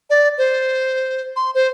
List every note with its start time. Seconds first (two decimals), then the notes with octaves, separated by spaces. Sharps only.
0.10 D5
0.38 C5
1.36 C6
1.55 C5